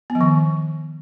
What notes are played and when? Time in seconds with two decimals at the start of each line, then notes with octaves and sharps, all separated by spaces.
0.10 B3
0.15 F3
0.21 D#3